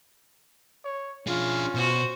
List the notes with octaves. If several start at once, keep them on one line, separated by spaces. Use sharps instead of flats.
C#5
C#4 D4 F4 G#4
B2 F#4 C5